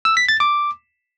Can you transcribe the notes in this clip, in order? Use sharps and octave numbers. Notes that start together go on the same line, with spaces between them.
E6
B6
A6
D6